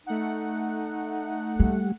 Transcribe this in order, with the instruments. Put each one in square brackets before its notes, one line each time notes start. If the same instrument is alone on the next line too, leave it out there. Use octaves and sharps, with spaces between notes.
[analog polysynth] A3 F#5 [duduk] D#4
[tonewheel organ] G3 [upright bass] A#3